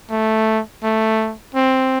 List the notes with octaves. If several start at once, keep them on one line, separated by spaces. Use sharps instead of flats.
A3
A3
C4